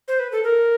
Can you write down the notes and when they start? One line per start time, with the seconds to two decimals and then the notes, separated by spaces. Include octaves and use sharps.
0.08 C5
0.20 B4
0.32 A4
0.44 A#4